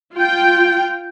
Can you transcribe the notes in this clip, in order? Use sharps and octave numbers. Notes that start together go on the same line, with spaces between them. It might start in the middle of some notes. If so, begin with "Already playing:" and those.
F4 G5